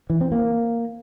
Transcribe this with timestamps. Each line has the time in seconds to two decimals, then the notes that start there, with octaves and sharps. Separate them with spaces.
0.10 E3
0.21 C4
0.32 A#3